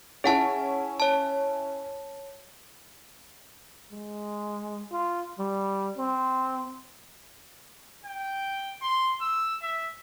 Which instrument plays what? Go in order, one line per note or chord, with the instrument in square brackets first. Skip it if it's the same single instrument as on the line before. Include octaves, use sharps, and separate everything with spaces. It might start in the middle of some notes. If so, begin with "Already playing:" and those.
[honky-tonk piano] C#4 E4 [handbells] G#4 F#5 A5
[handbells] C#5 A5
[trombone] G#3
F4
G3
C4
[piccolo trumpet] G5
C6
E6
E5